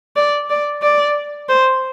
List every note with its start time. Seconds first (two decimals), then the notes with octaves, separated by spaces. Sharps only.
0.16 D5
0.50 D5
0.82 D5
1.49 C5